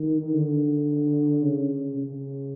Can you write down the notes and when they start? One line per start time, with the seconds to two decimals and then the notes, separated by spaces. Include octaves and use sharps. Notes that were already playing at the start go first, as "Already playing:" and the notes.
Already playing: D#3
0.32 D3
1.42 C#3
1.97 C#3